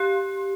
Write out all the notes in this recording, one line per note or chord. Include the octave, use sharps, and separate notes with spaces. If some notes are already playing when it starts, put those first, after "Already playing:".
Already playing: G4